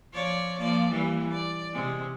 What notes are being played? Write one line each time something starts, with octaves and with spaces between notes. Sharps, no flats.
F3 C#5 D5
F3 A#3 D5
E3 G3 A#3
D5
C3 G#3